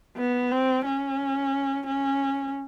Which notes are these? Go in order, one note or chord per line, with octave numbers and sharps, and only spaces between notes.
B3
C4
C#4
C#4